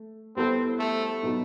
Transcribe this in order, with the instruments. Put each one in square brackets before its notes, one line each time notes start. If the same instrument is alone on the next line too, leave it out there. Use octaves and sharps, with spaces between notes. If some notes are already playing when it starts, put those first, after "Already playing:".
Already playing: [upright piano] A3
[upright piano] G3 B3 E4 A4 C5 [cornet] C4
[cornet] A3
[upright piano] B2 F#3 B3 D#4